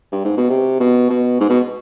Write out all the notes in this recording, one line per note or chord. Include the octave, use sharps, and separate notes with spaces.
G2
G#2
B2
C3
B2
B2
G#2
B2